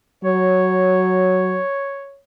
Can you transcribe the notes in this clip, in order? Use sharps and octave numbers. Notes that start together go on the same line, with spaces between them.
F#3 C#5